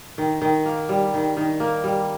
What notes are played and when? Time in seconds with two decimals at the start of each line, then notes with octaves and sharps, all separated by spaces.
0.18 D#3
0.42 D#3
0.66 A#3
0.89 G3
1.14 D#3
1.37 D#3
1.60 A#3
1.84 G3